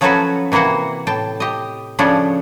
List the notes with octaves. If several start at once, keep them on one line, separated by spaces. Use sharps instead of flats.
F3 F#3 C#4 F#4 A4 B4
C3 E3 A#3 F#4 F#5
A2 G5 A5
G4 D#5
C#3 F3 A3 C#4 D4